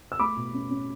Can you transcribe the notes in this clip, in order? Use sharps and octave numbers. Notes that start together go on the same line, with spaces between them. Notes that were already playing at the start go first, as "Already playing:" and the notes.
E6
A3 B5 D6
B2
C#4
C#4